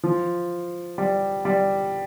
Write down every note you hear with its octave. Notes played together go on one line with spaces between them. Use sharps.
F3
G3
G3